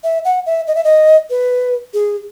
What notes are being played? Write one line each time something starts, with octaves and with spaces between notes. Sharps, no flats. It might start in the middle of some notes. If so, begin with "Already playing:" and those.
E5
F#5
E5
D#5
E5
D#5
B4
G#4